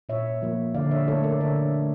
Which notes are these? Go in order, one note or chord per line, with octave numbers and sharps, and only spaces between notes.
A#2 C#5 E5
F3 A#3
D3 D5 F5
C#5 E5
A3 A4 C#5
A#4 D5
D3 C#5 E5
A3